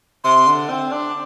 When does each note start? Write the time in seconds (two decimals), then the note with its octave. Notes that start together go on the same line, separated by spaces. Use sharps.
0.24 C3 C6
0.47 D3
0.70 C4
0.92 D4